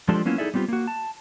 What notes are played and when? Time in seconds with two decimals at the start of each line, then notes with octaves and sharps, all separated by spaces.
0.08 F3 G#3 D4 F4 G4 A4
0.25 F#3 A#3 B3 C#4 E4 F4
0.38 D#4 E4 G#4 A4 D5 E5
0.54 G3 B3 C4 F4 G4
0.68 A#3 F#4
0.87 A5